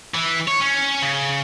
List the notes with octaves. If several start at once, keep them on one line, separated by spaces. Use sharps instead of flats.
E3
C#5
C#4
C#3